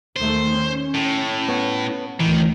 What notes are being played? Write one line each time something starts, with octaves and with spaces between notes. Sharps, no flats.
D#2 D#3 A3 C5
C#4
A2
B3 C#5
D2 A2 D#3 E3